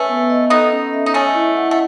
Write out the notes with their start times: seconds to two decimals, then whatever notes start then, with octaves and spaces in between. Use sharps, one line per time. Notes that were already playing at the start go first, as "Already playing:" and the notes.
Already playing: A3 C#4 B4 E5
0.09 B3
0.30 D#5
0.50 B3 D#4 A4
0.72 C#4
0.93 E5
1.06 D#4
1.14 A3 C#4 D#5
1.35 E4
1.57 F#5
1.71 A3